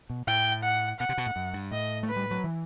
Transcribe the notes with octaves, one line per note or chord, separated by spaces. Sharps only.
B2
A2 G5
F#5
B2 F#5
C3
B2
A2
F#2
G2
A2 D#5
A3 B4
G3
F#3
E3